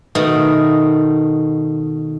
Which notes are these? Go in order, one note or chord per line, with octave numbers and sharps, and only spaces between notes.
B2 D#3 A3